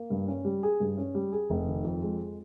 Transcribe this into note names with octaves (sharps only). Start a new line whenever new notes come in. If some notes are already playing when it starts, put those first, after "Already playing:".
Already playing: A#3
G2
C#4
G3
G#4
G2
C#4
G3
G#4
F1
D#3
F2
G#3